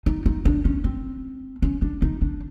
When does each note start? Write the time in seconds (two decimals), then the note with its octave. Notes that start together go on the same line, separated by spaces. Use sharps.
0.06 D#4
0.26 D#4
0.45 D4
0.65 C#4
0.84 C4
1.62 C#4
1.82 D4
2.02 D#4
2.22 D4